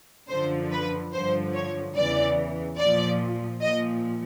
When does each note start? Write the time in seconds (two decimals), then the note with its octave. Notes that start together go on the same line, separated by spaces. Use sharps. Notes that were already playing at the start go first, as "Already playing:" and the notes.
0.29 F#2 D3 F3 C5
0.72 B4
1.13 G2 D3 F3 C5
1.54 C#5
1.95 E2 C#3 E3 D5
2.79 A#2 F3 D5
3.61 A#2 F3 D#5